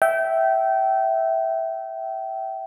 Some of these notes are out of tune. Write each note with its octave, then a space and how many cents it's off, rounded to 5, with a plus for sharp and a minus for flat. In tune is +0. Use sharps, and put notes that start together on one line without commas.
E5 -5 G5 -25